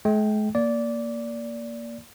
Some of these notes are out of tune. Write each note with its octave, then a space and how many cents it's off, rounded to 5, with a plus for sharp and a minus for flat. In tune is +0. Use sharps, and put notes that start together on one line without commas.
G#3 +45 G5 +0
A#3 +0 D5 -15